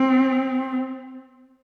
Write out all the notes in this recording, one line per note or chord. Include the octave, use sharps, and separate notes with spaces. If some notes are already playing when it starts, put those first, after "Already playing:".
Already playing: C4